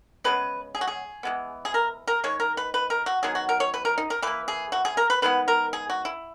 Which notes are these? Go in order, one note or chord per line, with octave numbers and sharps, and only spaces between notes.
C#3 G#3 B3 B4
G#4
F#4
G#4
E3 G#3 B3
G#4
A#4
A#4
D#3 G#3 C#5
A#4
B4
B4
A#4
F#4
D#3 F#3 B3 G#4
F#4
A#4
C#5
B4
A#4
D#4
A#4
E3 A#3 B4
G#4
F#4
G#4
A#4
B4
D#3 G#3 B3 B4
A#4
G#4
F#4
E4